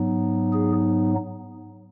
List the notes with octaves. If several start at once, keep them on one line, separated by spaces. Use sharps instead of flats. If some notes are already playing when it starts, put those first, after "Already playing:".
Already playing: G#2 F#3 B3 D#4
G#4